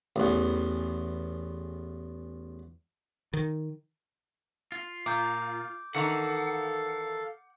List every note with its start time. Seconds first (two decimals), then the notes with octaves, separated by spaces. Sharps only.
0.16 A1 E2
3.33 D#3
4.72 F4
5.06 A#2 D6 G6
5.95 D#3 E3 A4 F5 F#5